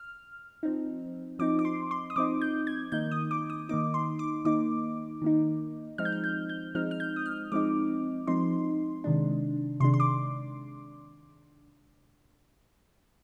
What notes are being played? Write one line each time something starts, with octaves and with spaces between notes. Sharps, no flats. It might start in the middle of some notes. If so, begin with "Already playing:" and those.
Already playing: F6
F3 C4 D#4
F3 C4 D#4 D6
D6
C6
C6
D#6
F3 C4 D#4 D6
G6
G#6
D#3 A#3 D#4 G6
D#6
D6
D#6
D#3 A#3 D#4 D6
C6
D6
D#3 A#3 D#4 D6
D#3 A#3 D#4
F3 G#3 C4 D#4 F6
G6
F6
G6
G6
F3 G#3 C4 D#4 F6
F6
G6
D#6
F6
F3 G#3 C4 D#4 D6
F3 G#3 C4 D#4 C6
C3 D#3 G#3 D4
C3 D#3 G#3 D4 C6
C6
D6